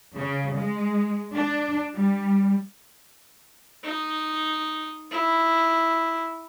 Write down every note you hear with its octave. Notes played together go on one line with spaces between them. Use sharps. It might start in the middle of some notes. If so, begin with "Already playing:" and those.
C#3
G#3
D4
G3
D#4
E4